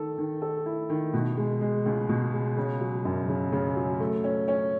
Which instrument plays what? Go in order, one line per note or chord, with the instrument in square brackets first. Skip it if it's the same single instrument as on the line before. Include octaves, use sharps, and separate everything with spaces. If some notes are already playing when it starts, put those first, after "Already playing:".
Already playing: [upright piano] D#3 A4
D#3
A4
E4
D#3
B2
G#3
G#3
C#2
B2
G#3
C#3
F#3
F#2
C#3
C#3
F#3
A3
C#4
C#4